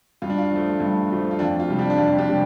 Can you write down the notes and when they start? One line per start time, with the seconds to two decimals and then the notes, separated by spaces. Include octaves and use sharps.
0.22 G2 F4
0.30 D4
0.38 F4
0.52 F3 A3
0.80 G2
1.11 F3 A3
1.31 F4
1.39 F2 D4
1.60 F4
1.68 C3 G3
1.79 D4 G4
1.90 D4
1.98 F2 F4
2.18 D4 G4
2.28 C3 G3